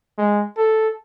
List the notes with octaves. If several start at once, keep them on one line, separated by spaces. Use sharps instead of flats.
G#3
A4